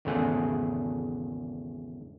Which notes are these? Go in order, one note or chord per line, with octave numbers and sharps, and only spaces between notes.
G#1 E2 C#3 A3 G#4 F#5